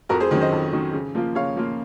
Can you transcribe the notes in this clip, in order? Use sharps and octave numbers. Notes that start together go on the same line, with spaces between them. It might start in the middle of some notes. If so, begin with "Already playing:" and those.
F2 F#4 A#4
G#4 C5
D#3 F#3 C#4
C5 D#5
F2
D#3 F#3 C#4
C#3
F3 A#3 F4
C#3 C#5 F5
F3 A#3 F4